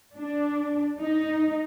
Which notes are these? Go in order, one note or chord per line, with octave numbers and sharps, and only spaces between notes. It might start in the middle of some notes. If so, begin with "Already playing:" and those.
D4
D#4